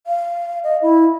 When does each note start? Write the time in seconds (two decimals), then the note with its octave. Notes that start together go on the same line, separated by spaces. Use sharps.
0.07 F5
0.64 D#5
0.82 E4